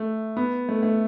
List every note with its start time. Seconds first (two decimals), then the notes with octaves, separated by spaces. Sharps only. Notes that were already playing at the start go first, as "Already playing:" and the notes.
Already playing: A3
0.37 B3
0.69 A3
0.83 A3